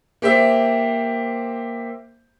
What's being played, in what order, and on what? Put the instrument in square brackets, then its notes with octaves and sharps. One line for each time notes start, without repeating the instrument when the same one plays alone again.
[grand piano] A#3 G4 C5 E5